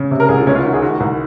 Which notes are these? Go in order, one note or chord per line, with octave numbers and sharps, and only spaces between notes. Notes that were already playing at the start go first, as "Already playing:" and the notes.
Already playing: C#3
C3
A#4
C2 G#4
F4
C#2 C#4
F4
D#3 F#4
G#4
D#3 F#4
C2